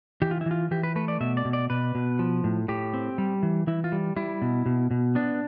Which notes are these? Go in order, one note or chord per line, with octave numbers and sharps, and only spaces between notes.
E3 G4
F4
E4
E3 F4
E3 G4
B4
A3 B4
D5
B2 E5
D5
B2
D5
B2 B4
B2
F3
A2
A2 G4
C4
G3
E3
E3 E4
F4
G3
G3 E4
B2
B2
B2
B3 D4